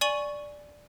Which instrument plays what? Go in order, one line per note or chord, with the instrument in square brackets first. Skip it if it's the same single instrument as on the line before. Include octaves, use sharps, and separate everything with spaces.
[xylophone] D5 G#5 C#6 D#7 F#7